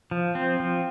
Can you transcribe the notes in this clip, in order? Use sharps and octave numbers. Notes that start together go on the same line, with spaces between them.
F3
C4
F3